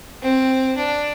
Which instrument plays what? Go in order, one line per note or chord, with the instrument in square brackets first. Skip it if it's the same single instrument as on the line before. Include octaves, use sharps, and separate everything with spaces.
[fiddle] C4
D4